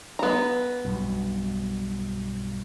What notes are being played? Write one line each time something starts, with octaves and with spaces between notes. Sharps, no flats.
B3 A#5
B1 G2 B2